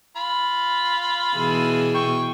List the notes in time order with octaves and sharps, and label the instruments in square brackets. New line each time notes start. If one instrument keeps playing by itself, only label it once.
[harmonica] F4 B5
[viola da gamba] B2 E3 G#4
[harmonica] G5 C#6